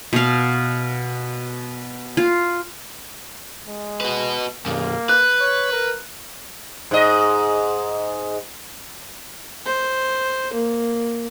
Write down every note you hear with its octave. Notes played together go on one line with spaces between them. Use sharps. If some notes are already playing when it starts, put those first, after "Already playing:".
B2 F5
F4
G#3
F#4 B4
B1 F#2 A#3
B4 F#6
C#5
A#4
G#2 D#5
C5
A#3